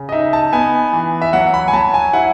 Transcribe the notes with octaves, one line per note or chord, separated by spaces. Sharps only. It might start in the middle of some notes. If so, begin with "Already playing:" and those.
Already playing: C#3
D#5
D#4 E5
A5
B3 G#5
E3
E5
F#3 F#5
B5
G#5
F#3 A5
G#5
E4 F#5